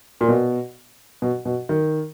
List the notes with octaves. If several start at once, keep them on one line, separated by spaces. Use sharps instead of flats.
A#2
B2
B2
B2
D#3